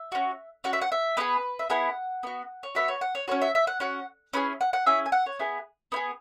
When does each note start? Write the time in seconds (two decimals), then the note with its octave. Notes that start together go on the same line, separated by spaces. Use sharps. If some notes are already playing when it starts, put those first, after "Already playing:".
Already playing: E5
0.12 C#4 F#4
0.64 C#4 F#4 F#5
0.73 E5
0.81 F#5
0.92 E5
1.17 B3 E4 G#4 B4
1.59 E5
1.70 B3 E4 G#4 F#5
2.23 B3 F#4
2.63 C#5
2.75 B3 F#4 E5
2.88 C#5
3.01 F#5
3.15 C#5
3.28 C#4 F#4 C#5
3.42 E5
3.55 E5
3.67 F#5
3.80 C#4 F#4 F#5
4.33 C#4 E4 G#4 B4
4.61 F#5
4.73 F#5
4.86 C#4 E4 G#4 E5
5.06 G#5
5.12 F#5
5.26 C#5
5.39 B3 E4 G#4
5.92 B3 E4
5.96 G#4